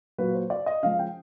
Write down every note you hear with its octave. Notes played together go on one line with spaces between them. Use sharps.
A#2 F#3 A#3 B4
C5
D5
D#5
C#3 F3 G#3 F5
G5